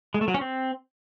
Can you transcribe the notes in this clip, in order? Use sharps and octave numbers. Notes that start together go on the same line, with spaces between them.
G#3
A3
F#3
C#4
C4